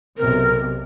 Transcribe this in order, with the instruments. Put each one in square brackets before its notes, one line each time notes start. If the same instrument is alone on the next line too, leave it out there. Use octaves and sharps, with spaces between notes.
[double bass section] B1 C3 [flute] A#4